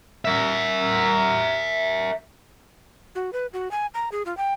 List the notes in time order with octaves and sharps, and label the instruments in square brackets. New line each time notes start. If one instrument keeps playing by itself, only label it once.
[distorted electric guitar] A#4 E5
[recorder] F#4
B4
F#4
G#5
A#5
G#4
F4
G5